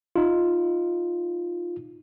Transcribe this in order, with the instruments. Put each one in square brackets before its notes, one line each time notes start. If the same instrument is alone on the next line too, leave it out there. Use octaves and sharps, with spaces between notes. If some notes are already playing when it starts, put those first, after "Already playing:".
[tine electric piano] D#4 F4